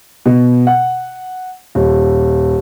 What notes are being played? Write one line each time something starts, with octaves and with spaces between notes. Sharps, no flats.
B2
F#5
D#1